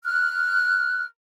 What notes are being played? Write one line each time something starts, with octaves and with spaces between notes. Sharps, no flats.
F6 F#6